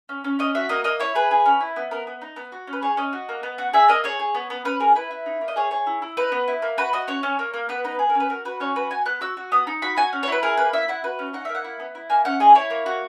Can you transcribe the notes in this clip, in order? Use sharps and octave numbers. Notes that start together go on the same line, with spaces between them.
C#4
C#4
C#4 D#5
F#4 E5
A#3 D#5
A#3 D#5
E4 C#5
G#4 B4
G#4
C#4
E4
B3
B3 A#4
B3
D#4
B3
F#4
C#4
B4
G#4 C#5
C#4 D#5
F#4
A#3
B3
F#4
G#4 E5
A#3 D#5
G#4 C#5
G#4
B3
B3
C#4 B4
G#4 A#4
E4 B4
E4
D#4
A#3
D#5
G#4 C#5
G#4 C#5
E4
E4
D#4 B4
B3
E4
A#3
F#4 B4
F#4 D#5
C#4 C#5
C#4
A#3
A#3
B3 B4
D#4 B4
G#4
A#4
C#4
B4
F#4 A#4
F#4 B4
C#4 C#5
F#4 B4
F#4 G#5
B3 F#6
F#4 E6
F#4
B3 D#6
D#4
F#4 B5
F#4 G#5
C#4
C#5
E4 B4
G#4 A#4
A#3 B4
E4 E5
E4 F#5
F#4 B4
C#4
D#4 F#5
A#3 E5
F#5
E4
B3
E4
A#3 G#5
C#4 F#5
G#4 D#5
E4 C#5
A#3
F#4